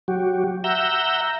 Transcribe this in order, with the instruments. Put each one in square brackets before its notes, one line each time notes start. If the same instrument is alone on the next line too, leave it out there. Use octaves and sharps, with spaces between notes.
[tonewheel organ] F#3 F#4 G4
E5 F#5 A#5 E6 G6